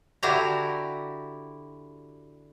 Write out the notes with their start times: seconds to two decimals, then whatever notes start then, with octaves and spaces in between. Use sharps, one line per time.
0.23 D3 D4 E4 F#4 G4 A#5